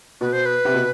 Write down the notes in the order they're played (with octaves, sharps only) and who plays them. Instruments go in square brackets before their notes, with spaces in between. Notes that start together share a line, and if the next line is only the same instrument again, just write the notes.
[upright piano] B2 [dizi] B4
[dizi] C5
B4
[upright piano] C3
B2